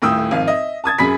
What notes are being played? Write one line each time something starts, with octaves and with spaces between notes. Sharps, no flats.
D#1 A2 G5 D#6 E6
G#1 F2 F5
D#5 E5
A5 D#6 G#6 A6
F#2 G#4 B5 B6